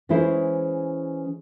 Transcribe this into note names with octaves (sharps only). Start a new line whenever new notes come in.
E3 G#3 C#4 E4 G#4 C5